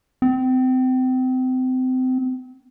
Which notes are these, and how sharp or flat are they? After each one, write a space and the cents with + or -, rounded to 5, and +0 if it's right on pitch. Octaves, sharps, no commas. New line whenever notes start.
C4 -30